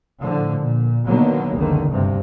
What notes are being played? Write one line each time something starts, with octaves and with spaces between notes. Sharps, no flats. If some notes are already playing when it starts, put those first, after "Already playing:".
A2 D3 F3
A#2
B2 D3 D#3 F#3 A#3 B3
F#1 C#2 D3 D#3
D2 G2 C3